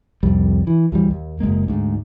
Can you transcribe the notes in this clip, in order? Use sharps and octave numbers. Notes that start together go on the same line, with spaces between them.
C2 F2 G3
E3
D2 E3 F#3 G3
D#2
F#1 G#2 G#3 A#3
D2 G#2